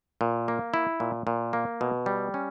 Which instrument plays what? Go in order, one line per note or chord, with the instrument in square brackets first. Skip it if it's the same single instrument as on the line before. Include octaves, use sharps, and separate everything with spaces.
[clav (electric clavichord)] A#2
A#3
E4
A#2
A#2
A#3
B2
G3
C#4